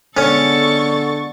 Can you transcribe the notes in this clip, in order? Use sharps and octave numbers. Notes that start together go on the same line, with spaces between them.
D3 G#3 B3 C#4 A4 C#6 A6